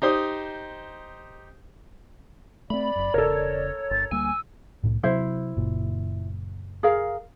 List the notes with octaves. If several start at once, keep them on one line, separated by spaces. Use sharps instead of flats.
D#4 G4 C5 D#6
A3 C4 D5 B5
F#1 F#2
E1 C#3 A4 A#4 C#5
G1 A6
D2 G3 A#3 G#5 E6
C2 A2
C3 F#3 E4 C5 E5
F#1 A#2
G#4 A#4 F5